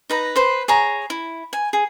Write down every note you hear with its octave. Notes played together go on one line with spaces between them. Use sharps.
D#4 B4 A#5
B4 C5 C6
G#4 C#5 A#5
E4
G#5
G#4